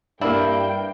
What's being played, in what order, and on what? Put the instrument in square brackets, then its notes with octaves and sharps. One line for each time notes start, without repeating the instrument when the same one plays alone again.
[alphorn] G2 [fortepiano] A#3 D4 [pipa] E4 [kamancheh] G5